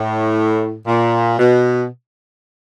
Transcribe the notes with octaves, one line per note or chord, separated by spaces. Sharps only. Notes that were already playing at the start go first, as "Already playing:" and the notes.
Already playing: A2
A#2
B2